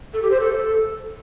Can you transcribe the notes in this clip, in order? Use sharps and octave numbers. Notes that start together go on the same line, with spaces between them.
A4
G4
C5
A4